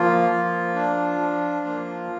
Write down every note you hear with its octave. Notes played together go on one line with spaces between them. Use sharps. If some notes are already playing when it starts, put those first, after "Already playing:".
Already playing: F3 A#3 F4
F3
D4
F3
A#3